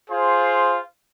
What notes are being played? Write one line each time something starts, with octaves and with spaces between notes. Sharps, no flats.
F4 G#4 C5